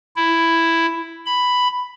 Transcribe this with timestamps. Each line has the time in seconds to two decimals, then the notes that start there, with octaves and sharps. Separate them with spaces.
0.16 E4
1.26 B5